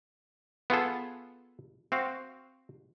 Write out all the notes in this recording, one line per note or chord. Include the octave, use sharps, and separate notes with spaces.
B3 F4 G#4 A4
C4 F#4 F5